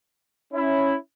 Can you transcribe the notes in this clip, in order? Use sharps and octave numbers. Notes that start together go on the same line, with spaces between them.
C#4 E4